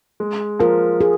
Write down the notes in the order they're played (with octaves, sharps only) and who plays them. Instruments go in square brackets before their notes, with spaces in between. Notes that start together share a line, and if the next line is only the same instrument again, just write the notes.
[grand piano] G#3
[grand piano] F3 [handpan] A#4
[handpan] G#4